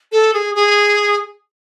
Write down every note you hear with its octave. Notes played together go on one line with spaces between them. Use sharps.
A4
G#4
G#4